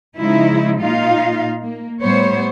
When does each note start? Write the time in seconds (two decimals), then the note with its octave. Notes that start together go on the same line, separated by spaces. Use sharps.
0.19 C#3 F3 G#3 D#4 E4
0.79 A#2 D#4 F4 F5
1.63 A#3
2.02 A2 G3 B3 C5 C#5